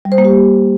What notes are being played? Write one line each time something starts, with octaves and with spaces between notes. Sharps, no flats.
G3
C5
A#3
G4